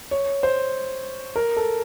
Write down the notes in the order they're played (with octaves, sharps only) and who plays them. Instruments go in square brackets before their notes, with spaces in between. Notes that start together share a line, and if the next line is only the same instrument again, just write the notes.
[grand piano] C#5
C5
A#4
A4